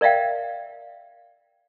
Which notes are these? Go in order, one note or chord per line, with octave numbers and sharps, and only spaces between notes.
A#4 D5 E5 F5 G5